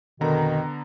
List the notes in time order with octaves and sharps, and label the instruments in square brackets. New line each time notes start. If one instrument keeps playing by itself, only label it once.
[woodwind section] F2 B2 D#3 [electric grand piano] D3 B3 A#5